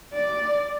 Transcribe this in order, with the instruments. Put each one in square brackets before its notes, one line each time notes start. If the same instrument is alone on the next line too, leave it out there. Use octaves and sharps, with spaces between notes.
[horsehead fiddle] D5